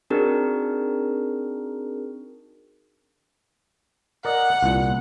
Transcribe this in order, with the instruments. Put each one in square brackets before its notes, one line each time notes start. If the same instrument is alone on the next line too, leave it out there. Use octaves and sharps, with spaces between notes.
[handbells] C4 D4 D#4 F#4 G#4 A#4
[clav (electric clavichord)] A#4 D5 D#5 [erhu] F#5
[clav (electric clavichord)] C2 A#2